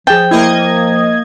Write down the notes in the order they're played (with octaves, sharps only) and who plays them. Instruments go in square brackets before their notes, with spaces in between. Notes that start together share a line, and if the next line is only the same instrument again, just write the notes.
[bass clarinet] F3 [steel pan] G#4 A5 [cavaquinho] G5
[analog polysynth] A#3 D#5 G#6 [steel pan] E4